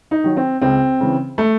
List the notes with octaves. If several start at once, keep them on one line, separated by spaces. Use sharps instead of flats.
D#4
D#3 F#3
C4
C#2 C4
C#3 E3
A3